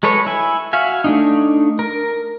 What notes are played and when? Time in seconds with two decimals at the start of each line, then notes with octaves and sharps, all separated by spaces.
0.03 G#3 A4 B4 C#5
0.26 E4 G#5
0.73 F#4 E5 F5 G#5
1.04 A3 D4 D#4
1.79 A#4